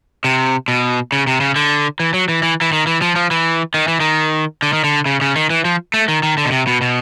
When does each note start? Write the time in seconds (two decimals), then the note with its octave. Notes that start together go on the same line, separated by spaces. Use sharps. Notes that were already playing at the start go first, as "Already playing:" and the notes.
0.24 C3
0.68 B2
1.12 C#3
1.27 C3
1.41 C#3
1.56 D3
2.00 E3
2.14 F#3
2.29 E3
2.43 E3
2.61 E3
2.73 D#3
2.87 E3
3.02 F3
3.16 F3
3.31 E3
3.74 D#3
3.88 E3
4.00 D#3
4.62 D3
4.73 D#3
4.84 D3
5.06 C#3
5.21 C#3
5.36 D#3
5.50 E3
5.65 F3
5.94 A3
6.08 D#3
6.23 D#3
6.37 D3
6.45 B2
6.52 C3
6.67 B2
6.81 B2